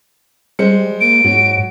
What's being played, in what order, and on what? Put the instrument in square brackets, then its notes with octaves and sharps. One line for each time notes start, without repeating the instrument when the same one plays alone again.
[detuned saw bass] G3 [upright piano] G#3 C5 C#7
[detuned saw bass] A#3 [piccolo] D7
[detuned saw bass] G#2 [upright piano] F#3